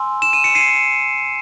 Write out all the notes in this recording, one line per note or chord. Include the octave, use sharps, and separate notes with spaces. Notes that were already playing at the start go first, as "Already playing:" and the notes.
Already playing: G#5 C6 E6
E7
D#7
C#7
C7 D#7